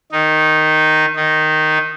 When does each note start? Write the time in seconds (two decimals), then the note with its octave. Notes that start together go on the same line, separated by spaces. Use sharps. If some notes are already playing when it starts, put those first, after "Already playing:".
0.11 D#3 D#4
1.16 D#3 D#4